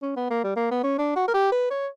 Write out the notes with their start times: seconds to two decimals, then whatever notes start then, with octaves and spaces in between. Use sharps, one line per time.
0.02 C#4
0.16 B3
0.30 A#3
0.44 G3
0.56 A#3
0.71 B3
0.84 C#4
0.98 D4
1.16 F#4
1.28 A#4
1.34 G4
1.52 B4
1.71 C#5